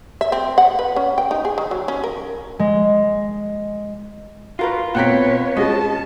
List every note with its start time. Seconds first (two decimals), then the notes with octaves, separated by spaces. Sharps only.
0.21 E5
0.32 C4
0.58 F#5
0.79 B4
0.96 C#4
1.18 G5
1.31 D#4
1.45 G#4
1.58 D#3
1.71 F#3
1.88 C#4
2.04 A#4
2.59 G#3
4.59 F4 F#4 A#4 B4
4.95 B2 C4 B4 C#5 F#5 G5 A#5 B6
5.57 G#3 C#4 F#4 G#4 D#5 A5